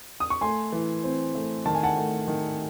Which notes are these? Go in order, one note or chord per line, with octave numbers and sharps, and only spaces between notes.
D#6
C#6
A3 G#5 C6
E3
C4
A3
D#3 A5
G#5
F#5 A5
A3
D#3